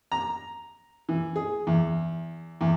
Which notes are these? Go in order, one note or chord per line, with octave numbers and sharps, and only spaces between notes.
A#5
E3
G#4
E2
E2